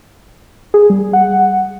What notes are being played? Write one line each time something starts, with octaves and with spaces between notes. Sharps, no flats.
G#4
G3
F#5